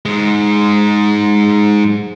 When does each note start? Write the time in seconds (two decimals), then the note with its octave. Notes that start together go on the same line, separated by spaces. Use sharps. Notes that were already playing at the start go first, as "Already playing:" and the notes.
0.06 G#2 G#3